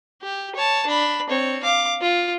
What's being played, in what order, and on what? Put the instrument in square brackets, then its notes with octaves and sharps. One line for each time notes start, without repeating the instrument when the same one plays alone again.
[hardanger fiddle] G4
C#5 A5
D4 B5
C4 C#5
F5 D6
F4